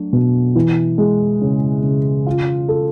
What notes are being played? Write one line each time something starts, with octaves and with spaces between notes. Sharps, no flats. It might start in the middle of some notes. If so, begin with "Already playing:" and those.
Already playing: F#3 A3 D4
B2
E3
G#3
C#3
C#3
F4
A4